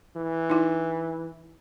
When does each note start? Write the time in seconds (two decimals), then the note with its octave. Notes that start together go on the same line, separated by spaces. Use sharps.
0.17 E3
0.50 D#4 E4